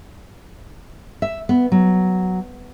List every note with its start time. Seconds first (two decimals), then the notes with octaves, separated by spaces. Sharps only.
1.22 E5
1.49 B3
1.72 F#3